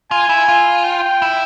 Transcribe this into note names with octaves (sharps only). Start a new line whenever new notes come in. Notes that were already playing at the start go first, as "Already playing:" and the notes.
F4 G#5
E4
F4
G5
E4